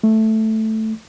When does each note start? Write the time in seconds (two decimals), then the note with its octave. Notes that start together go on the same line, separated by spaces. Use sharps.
0.04 A3